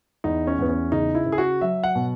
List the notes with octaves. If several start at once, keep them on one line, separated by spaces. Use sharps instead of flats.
E2 D#4
C#4
E2 B3
C#4
C#3 D#4
E4
C#3
G#4
F#4
F#3 E5
F#5
B2